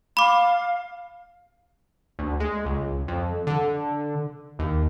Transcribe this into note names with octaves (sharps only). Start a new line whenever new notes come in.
F5 B5 D6
D2
G#3
C#2
F2
D3
D#2